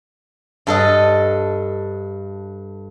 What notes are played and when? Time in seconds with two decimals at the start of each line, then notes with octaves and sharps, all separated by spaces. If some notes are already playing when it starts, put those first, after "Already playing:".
0.67 G2 A4 D#5